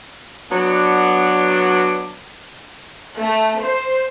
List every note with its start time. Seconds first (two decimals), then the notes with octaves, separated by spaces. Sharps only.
0.51 F#3 B3 D4
3.17 A3
3.61 C5